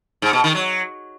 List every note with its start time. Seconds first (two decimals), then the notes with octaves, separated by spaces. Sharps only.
0.22 G#2
0.33 B2
0.44 D#3
0.55 F#3